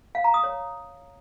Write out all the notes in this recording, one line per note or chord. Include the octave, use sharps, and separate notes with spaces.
F5
A#5
D#6
C#5